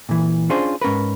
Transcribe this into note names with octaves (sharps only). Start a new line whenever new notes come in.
A#2 E3
C#4 D4 F4 G#4 C5
G#2 C#4 A#4 B4